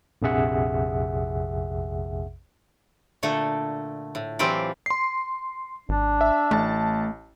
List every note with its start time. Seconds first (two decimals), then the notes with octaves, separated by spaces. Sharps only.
0.22 A#1 F2 C3 G#4 E5 F#5
3.23 A#2 D3 A3 A4
4.15 A2
4.39 E3 F#3 C4 F4 G4 D5
4.86 C6 C7
5.89 G#1 D4
6.21 E5
6.51 A1 A3 A5